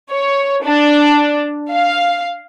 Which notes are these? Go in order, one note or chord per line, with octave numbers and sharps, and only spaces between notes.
C#5
D4
F5